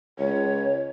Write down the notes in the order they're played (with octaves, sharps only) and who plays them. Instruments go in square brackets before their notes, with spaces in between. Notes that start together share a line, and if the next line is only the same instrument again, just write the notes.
[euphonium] C#2 [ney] C#5